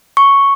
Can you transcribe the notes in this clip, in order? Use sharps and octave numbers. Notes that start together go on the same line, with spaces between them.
C#6